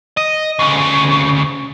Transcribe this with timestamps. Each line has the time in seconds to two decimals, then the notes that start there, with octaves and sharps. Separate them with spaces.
0.17 D#5
0.59 D2 C#3